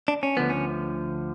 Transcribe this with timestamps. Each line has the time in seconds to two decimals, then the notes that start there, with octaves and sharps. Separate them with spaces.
0.08 D4
0.23 C#4
0.37 D2 D3 F3 B3
0.50 C#4